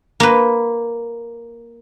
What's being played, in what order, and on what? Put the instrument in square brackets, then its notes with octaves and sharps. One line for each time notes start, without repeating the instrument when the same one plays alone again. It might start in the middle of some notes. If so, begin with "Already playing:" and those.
[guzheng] A#3 B4